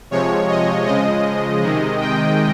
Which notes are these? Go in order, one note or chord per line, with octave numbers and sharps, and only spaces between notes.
C3 F3 G#3 C#5
D#5
C#3 F3 G#3 D#5
C3 D#3 G#3
G5